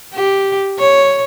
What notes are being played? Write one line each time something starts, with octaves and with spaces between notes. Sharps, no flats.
G4
C#5